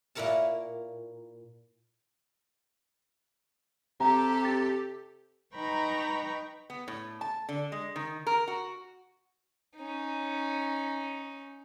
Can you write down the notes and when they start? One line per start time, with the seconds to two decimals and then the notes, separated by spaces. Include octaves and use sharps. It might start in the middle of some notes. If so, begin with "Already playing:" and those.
0.15 A#2 A#3 E4 A#4 C#5 A5
4.00 C3 G4 A4 A#5
4.45 A6
5.54 D#4 B4 G5 A#5 B5 C#6
6.70 B3
6.88 A2
7.21 A5
7.49 D3
7.72 G#3
7.96 D#3
8.27 A#4
8.48 F#4
9.77 C#4 D#4